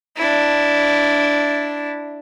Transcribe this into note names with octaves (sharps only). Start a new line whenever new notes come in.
D4 E4